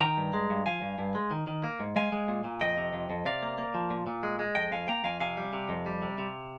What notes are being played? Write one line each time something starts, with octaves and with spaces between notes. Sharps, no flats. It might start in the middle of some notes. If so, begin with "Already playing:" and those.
D#3 G5 A#5
G2
G#3
G2
F3 F5 G#5
G2
G2
G#3
D#3
D#3
A#3
G#2
G#3 F5 G#5
G#3
A#2
A#2
F2 D#5 G5
C3
F2
F2
C3 D5 F5
A#3
A#3
F3
A#2
A#2
G#3
G#3
F2 D#5 G5
F2 F5 G#5
A#3 G5 A#5
F2 F5 G#5
C3 F5 G#5
G3
C3
F2
G3
C3
C3